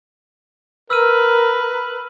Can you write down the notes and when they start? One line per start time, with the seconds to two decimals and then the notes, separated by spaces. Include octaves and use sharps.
0.90 A#4 B4 E6 F6 D#7